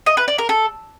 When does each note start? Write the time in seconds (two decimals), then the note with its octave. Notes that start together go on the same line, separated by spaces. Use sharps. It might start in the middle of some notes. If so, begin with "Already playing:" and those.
0.06 D#5
0.17 B4
0.28 D5
0.38 A#4
0.49 A4